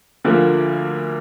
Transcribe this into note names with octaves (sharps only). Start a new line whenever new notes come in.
D2 D3 F3 A#3